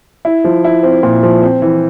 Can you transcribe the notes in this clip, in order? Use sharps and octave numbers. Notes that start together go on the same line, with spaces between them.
E4
F3
E4
C4
A#2
F3
C4
E3